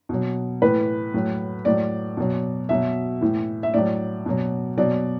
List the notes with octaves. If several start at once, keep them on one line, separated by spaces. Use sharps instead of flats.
B2 F#3
A2 E3 B4
A2 F#3
A2 F#3 D5
B2 F#3
B2 F#3 E5
A2 E3
E5
A2 F#3 D5
B2 F#3
B2 F#3 D5